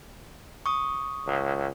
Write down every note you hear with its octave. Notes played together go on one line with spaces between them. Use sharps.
C#6 D#6
C#2